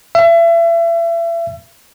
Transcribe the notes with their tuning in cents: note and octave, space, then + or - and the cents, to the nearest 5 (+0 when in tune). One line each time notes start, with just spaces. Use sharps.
E5 +35